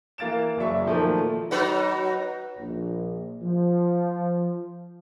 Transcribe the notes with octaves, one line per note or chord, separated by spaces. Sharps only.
E3 A#3 F5 A6 D7 E7
F#1 F#3 D5 E5 C#6
A#2 D#3 F3 F#3 A3 A#3
F#3 D#4 B4
A#1
F3